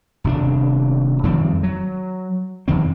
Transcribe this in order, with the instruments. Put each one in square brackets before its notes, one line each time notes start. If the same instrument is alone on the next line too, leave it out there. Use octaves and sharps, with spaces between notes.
[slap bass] D#1 C3 C#4 D4
F2 D#3 G3 C4
F#3
F2 D#3 C4